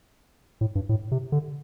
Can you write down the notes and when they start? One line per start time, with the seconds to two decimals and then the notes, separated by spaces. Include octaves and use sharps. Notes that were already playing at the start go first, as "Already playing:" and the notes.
0.61 A2
0.75 G2
0.89 A2
1.11 C3
1.32 D3